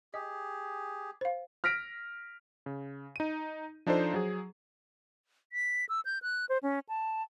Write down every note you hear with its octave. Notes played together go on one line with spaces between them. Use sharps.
G4 G#4 D#5
C5 F5
F6 A#6 B6 D7
C#3
D#4 D#7
F3 D4 D#4 A4 C5
F#3 G#4
B6
E6
G6
F#6
C5
C#4
A5